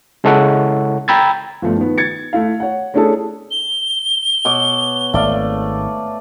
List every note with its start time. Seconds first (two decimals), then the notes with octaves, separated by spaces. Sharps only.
0.24 C#3 G#3 E4 A4 C#5 F#5
1.08 G5 A#5 B5 E6 G#6 A6
1.62 G1 F3 A3
1.77 D#3 B3
1.98 G#6 A6 C#7
2.33 A3 E4 F5
2.60 C#5 F#5
2.94 A3 C#4 D4 E4 G#4 A4
3.51 G7
4.45 B2 C#5 D6
5.14 G#1 A3 D5 F5